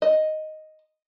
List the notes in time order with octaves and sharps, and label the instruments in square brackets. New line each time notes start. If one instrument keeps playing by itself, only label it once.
[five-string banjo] D#5